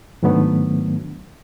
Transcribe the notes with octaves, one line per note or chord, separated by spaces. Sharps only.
G#2 D#3 F#3 A3 B3 D4